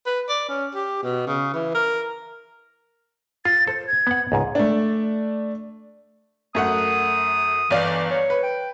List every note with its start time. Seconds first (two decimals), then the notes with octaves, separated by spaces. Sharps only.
0.06 B4
0.29 D5
0.49 C#4
0.75 G4
1.03 B2
1.27 C#3
1.54 E3
1.75 A#4
3.45 F4 A6
3.68 A4 C5
3.87 G#6
4.07 B3 F#5
4.32 C#2 G#2 G#5
4.55 A3 D4
6.55 F#2 A3 F#5 D#6
7.70 G1 E3 D5 F5
8.11 C#5
8.30 B4
8.43 G5